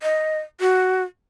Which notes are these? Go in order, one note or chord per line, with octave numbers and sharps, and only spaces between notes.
D#5
F#4